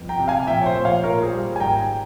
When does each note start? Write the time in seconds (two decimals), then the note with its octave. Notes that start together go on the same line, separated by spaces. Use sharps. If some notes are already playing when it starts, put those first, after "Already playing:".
Already playing: G1 F2
0.09 G5 A#5
0.19 C3
0.28 F5 G#5
0.47 A#1 E5 G5
0.61 C#5
0.66 C5 E5
0.76 A#1
0.85 C#5 F5
1.04 A#2 A#4 C#5
1.23 G#4 C5
1.32 G3
1.56 G#5
1.60 G#1 G5 A#5